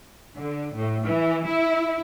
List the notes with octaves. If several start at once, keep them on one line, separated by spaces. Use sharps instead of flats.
D3
A2
E3
E4